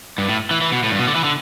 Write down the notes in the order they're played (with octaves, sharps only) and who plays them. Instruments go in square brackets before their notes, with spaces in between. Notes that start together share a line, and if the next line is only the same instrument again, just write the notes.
[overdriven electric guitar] G2
A2
E3
E3
B2
A2
G2
B2
D3
E3
D3